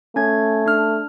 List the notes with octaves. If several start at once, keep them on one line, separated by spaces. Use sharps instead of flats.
A3 C#4 G#6
D4 F6